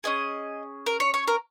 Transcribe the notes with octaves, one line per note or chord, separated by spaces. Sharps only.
C#4 G#4 D#5
A#4
C#5
C#5
A#4